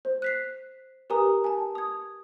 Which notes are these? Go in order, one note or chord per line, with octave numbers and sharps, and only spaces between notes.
C5
F#6 B6 C7
G4 A#4 B4 G#5 A#5 D#6
G#5 A5
D#6 G#6